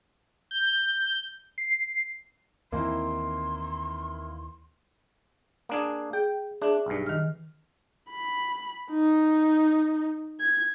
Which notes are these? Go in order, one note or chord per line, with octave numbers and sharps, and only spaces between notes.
G6
C7
D#2 D#3 E3 A#3 C4 E4 C6
A#3 D4 G#4
G#4 G5
D4 G#4 E5
B1 G2
D#3 F6
B5
D#4
G#6